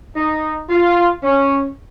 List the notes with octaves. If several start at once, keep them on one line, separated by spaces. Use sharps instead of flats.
D#4
F4
C#4